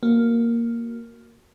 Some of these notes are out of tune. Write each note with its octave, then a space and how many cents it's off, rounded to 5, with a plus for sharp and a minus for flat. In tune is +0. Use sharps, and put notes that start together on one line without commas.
A#3 +0 F#4 +0